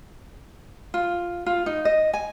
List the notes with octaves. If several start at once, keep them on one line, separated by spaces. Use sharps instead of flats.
F4
F4
D#4
D#5
G#5